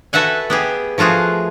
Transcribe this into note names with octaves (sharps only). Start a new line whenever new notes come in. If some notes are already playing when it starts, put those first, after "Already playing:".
F#4 A4 B4 E5 F#5 G#5
B3 G4 G#4
F3 A3 F4 F#4 G#4